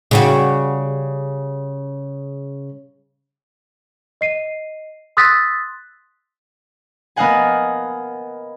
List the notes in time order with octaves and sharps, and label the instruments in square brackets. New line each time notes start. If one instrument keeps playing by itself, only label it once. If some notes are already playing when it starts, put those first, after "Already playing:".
[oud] C#3 G3 F#4
[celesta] D#5 C7 D#7
C6 D#6 E6 F#6 A6 B6
[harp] B3 A#4 D#5 F5 F#5 G#5